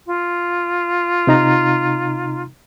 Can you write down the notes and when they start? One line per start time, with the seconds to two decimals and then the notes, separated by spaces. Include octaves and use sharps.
0.06 F4
1.27 C3 D#4 A#5